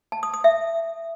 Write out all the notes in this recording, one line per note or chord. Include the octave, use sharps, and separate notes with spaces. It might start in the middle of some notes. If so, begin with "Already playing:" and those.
A5
D#6
D#6
E5